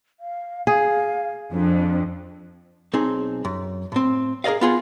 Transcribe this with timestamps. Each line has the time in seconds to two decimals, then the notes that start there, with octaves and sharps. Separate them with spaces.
0.20 F5
0.67 G#4 F5
1.52 F2 D4
2.93 B1 C4 D#4 G#4
3.45 F#2
3.92 A2 C4
4.44 G#4 A#4 D5 D#5 F5
4.61 B3 F4 G#4